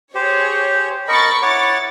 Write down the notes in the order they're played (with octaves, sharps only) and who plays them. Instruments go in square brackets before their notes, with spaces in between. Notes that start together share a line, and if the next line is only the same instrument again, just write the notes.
[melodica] G4 C5 [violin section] G#4 C#5
[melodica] A#4 D#5 [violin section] B5 C#6 A6
[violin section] E4 A6 [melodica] C#5 F#5 D6